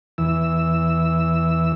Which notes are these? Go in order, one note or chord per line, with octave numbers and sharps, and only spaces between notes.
E2 E3 E6